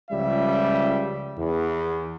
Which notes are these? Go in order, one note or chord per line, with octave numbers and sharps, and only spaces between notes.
C#2 C#3 F3 G3 E5
E2